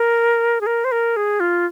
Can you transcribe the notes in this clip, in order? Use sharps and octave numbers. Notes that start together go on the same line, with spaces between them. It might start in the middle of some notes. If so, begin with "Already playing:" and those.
Already playing: A#4
G#4
A#4
C5
A#4
G#4
F4